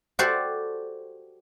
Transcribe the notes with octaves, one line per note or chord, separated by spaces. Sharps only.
F#4 G4 A4 C5 D5